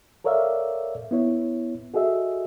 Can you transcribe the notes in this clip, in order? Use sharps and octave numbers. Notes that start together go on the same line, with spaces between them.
A4 A#4 C#5 D5 E5 F5
B3 E4 C#5
F#4 G#4 A4 D#5 E5